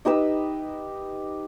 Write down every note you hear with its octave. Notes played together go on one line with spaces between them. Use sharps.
D#4 G4 B4 E6